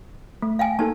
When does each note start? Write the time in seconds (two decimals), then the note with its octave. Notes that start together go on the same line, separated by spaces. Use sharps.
0.42 A3
0.59 F5 G5 G#5
0.79 A#3 D#4 A4 A5